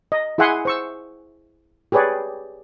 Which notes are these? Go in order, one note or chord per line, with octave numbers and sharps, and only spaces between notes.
D#5
E4 G#4 E5 F#5 G#5 C6
C5 C#6 E6
G4 G#4 B4 C#5 D5